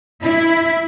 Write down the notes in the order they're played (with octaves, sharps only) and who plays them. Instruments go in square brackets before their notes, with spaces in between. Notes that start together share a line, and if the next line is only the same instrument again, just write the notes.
[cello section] E4